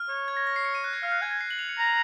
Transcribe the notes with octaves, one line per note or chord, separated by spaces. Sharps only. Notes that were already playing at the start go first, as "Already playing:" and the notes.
Already playing: F6
C#5
G#6
A#6
A#6
C7
C#7
D#7
F#6
G#6
F5 F6
F#6
G#5 G#6
A#6
C7
F#7
F7
C#7
A#5